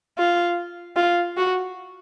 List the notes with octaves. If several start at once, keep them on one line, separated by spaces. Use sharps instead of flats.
F4
F4
F#4